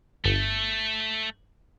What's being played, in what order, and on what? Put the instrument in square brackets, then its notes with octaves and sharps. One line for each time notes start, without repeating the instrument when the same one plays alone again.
[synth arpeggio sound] G1 [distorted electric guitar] A3